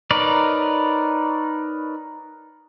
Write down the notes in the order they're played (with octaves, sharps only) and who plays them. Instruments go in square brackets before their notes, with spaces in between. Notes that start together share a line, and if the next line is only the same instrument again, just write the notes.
[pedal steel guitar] D#4 A#4 B4 C#5 D5